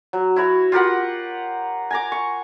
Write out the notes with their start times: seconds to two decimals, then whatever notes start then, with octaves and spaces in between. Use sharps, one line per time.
0.13 F#3
0.36 E4 F#4 C#5
0.72 F4 G4 A#4 F#5
1.91 G#5 A#5 D6
2.12 C#6